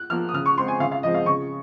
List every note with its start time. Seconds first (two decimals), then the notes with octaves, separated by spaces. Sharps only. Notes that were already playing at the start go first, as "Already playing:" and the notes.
Already playing: F#6
0.10 F3 A#3 F6
0.29 D#6
0.34 C#3 F6
0.46 C#6
0.57 G#3 C4 C6
0.68 G#5
0.80 C#3 F5
0.92 F5
1.03 F3 G#3 C4 D#5
1.14 F5
1.26 C#3 C#6